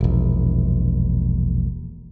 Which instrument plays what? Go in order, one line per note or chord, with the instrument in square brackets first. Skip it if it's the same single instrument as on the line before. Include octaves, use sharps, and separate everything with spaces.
[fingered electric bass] E1 A#1